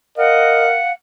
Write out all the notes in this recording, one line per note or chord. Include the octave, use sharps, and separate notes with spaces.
A#4 D#5 F5 F#5